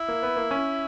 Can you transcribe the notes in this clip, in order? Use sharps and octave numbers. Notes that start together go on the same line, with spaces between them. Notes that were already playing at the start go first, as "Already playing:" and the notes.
Already playing: E4
A#3
B3
A#3
C#4